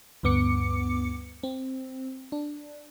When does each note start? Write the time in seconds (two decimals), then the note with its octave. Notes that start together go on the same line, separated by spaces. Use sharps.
0.23 D2 G2 B3 D6 C#7
1.43 C4
2.32 D4